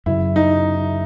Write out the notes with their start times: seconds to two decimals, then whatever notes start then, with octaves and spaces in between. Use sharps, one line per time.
0.06 F#2 C#3 F#3 E4
0.36 D#4